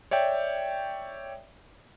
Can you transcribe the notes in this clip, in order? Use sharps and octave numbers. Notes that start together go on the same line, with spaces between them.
C#5 D5 E5 G5